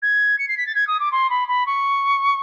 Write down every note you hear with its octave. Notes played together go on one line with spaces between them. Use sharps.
G#6
C#7
C7
B6
A6
G#6
D#6
D6
C6
B5
B5
C#6